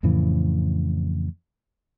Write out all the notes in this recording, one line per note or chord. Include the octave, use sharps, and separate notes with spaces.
F2 A2 C#3 E3